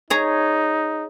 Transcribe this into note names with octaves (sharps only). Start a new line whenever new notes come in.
D#4 G#4 C#5 A#5